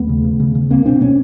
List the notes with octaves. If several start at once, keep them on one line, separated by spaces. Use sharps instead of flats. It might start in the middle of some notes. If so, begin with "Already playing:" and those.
Already playing: D#2 A3 B3
C#3
C#3
C#3
C#3
C#2 A#3 C4
B2 C4 D4
B2 B3 C#4